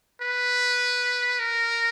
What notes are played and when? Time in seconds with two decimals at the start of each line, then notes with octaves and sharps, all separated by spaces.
0.21 B4
1.40 A#4